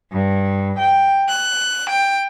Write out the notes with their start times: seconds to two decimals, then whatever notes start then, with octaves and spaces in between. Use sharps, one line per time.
0.12 G2
0.78 G5
1.30 F#6
1.89 G5